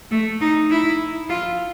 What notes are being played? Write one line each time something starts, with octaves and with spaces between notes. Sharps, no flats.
A3
D#4
E4
F4